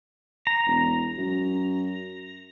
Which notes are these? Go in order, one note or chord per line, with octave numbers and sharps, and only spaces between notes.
A#5
E1
F#2